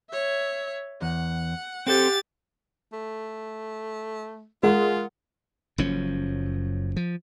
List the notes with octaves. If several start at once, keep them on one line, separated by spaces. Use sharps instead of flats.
C#5 E5
E2 F#5
C4 G4 A4 C5 A6
A3
G#3 F4 A#4 F#5
F#1 F#2 F3 C#4
F3